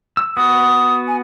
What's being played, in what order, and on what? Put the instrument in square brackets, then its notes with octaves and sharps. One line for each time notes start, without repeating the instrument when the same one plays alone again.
[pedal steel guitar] E6
[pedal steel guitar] B3 F#4 [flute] D#6
[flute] G#5